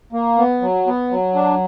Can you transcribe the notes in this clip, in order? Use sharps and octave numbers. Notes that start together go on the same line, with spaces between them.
A#3
B3
F#3
B3
F#3
D4